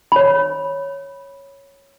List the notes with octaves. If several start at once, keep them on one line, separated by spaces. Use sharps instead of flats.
C#5 B5